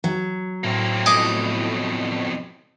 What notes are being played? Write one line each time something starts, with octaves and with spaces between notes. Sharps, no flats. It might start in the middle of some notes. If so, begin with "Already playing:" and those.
F#3
A2 A#3 C4
F2 B2 D#5 G#5 D6